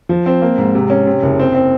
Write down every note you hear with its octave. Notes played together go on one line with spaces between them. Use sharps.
F3
C4
A#3
G#2
C3
C#4
C3
F#1
C4
C4